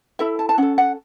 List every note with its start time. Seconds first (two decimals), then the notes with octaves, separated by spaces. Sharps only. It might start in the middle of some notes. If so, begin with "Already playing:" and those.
0.19 E4 A4 E5
0.39 A5
0.49 A5
0.58 C#4 A4 F#5
0.78 F#5